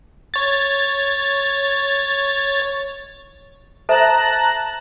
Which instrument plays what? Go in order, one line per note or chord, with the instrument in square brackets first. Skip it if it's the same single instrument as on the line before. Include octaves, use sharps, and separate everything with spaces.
[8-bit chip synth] C#5 A6
[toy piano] A4 C5 E5 [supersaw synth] A5 A#5 F#6